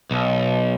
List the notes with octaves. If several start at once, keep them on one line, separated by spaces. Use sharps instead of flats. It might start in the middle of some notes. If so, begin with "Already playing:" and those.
B1